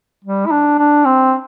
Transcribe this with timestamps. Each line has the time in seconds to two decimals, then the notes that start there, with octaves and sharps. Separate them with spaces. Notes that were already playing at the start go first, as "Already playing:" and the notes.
0.24 G3
0.46 E4
0.51 D4
0.78 D4
1.05 C4